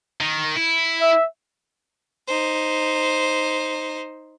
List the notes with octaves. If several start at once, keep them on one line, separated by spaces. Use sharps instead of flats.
D#3
E4
E5
D#4 C5